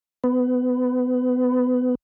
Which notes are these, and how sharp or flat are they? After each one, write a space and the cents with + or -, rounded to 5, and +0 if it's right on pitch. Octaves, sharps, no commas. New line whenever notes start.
B3 +25